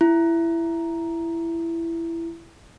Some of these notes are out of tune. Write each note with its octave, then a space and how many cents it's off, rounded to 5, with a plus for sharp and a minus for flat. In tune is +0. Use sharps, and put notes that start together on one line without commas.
E4 +15